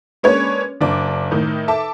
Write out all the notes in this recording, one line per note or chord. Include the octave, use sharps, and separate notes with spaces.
G#3 A#3 C#4 D4 B4 C#5
F#1 D4 D6
A2 D#3 D#4
A4 E5 A5 D6